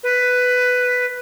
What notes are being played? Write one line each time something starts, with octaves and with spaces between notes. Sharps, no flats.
B4